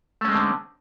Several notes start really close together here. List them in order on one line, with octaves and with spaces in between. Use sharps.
A3 C#4 G#3 C4 D3